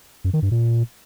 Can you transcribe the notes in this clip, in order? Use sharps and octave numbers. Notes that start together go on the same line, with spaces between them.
F#2
D#3
G2
A#2